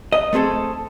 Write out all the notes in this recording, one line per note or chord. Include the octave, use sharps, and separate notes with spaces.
D#5
A3 C4 G#4 A4